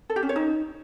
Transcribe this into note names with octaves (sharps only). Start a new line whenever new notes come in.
A4
G4
C#4
C#5
D#4